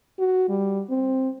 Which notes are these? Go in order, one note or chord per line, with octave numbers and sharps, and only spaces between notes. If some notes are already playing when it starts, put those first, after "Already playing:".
F#4
G3
C4